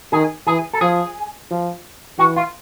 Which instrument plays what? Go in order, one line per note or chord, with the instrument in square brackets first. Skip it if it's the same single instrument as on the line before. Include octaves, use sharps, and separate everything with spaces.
[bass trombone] D#3 [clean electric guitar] G#4
[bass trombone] E3 [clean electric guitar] G#4
[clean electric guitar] A4
[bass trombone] F3 [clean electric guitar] G#4
[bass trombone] F3
[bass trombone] E3 [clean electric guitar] F#4
[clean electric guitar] F4